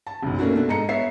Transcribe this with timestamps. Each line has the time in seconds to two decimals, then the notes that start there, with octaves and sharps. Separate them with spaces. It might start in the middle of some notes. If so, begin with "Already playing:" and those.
0.07 A5
0.22 F#1 B1
0.39 A3 A#3 C#4 D4 F#4
0.54 B2 A3 D4
0.68 G#2 A4 D#5 A#5 C#7
0.89 B3 C#5 E5 C7